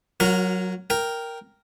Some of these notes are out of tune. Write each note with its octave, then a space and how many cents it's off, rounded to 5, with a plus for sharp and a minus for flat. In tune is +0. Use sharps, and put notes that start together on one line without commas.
F#3 +0 F#4 -40 A#4 +0
A#4 +0 G5 +0